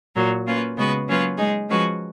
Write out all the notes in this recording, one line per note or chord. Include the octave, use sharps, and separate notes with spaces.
A#2 F#3 A#3
A#3 C#4 F4 B4
C#3 G#3 B3 F#4 B4
F#3 A#3 C#4 F4 B4
G#3 D#4 G#4
F3 G#3 C#4 F#4 B4